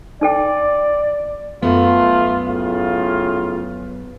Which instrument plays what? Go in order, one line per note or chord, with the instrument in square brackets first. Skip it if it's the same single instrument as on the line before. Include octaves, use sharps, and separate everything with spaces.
[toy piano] D#4 A4 G5 [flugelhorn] D5
[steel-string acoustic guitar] F#2 B3 [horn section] A3 F4
[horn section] A2 C#3 F4